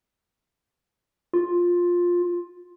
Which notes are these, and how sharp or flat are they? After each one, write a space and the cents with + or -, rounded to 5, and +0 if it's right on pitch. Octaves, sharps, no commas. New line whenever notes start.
F4 +10